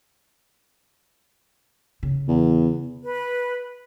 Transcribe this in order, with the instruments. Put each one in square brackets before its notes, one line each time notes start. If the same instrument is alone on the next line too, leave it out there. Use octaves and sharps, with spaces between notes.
[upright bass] C#3
[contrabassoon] E2
[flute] B4